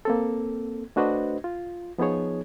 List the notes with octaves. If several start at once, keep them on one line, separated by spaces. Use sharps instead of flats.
A#3 C4 A4
A3 D4 F#4 B4 C5 D#5
F4
F3 B3 D#4 G#4 C#5